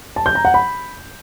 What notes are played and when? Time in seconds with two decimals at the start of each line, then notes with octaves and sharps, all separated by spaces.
0.16 A5
0.26 G6
0.35 A#5
0.45 F#5
0.54 B5